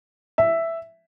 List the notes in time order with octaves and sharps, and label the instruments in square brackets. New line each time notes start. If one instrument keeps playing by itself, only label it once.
[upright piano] E5